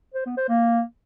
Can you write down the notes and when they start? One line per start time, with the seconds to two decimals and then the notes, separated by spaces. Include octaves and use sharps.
0.14 C5
0.26 B3
0.37 C5
0.49 A#3